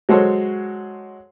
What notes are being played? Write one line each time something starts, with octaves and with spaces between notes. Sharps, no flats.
F#3 G#3 F#4 A4 C5 C#5